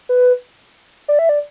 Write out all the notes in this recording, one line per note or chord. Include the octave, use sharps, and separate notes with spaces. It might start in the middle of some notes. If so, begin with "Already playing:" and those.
B4
D5
E5
D5